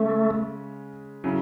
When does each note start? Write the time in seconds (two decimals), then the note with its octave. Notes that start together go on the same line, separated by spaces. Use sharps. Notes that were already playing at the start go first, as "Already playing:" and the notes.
Already playing: C#3 G#3 A3 C#4
1.24 C#3 F#3 C#4 E4